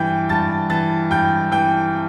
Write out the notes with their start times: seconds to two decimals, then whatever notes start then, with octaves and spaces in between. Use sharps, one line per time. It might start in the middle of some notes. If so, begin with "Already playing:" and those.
Already playing: G2 E3 G5 G6
0.29 G2 A5 A6
0.70 E3 A5 A6
1.11 G2 G5 G6
1.51 E3 G5 G6